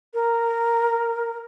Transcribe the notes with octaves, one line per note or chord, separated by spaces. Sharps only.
A#4